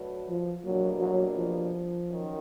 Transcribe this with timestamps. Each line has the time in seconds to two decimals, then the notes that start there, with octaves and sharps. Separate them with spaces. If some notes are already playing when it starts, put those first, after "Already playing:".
Already playing: F#3 A3 D4 F#4 B4
0.29 F3
0.64 E2 B2 F#3 G3 A#3 D4
1.00 F#3
1.36 F3
2.08 F#2 D#3